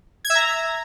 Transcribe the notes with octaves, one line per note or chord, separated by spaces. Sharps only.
G#6
E5
A#5